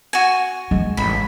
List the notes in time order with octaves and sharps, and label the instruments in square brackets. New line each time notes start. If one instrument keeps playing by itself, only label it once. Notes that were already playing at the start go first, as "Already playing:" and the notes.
[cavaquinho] F#4 G#5
[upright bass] G#3
[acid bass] A1 [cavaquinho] B5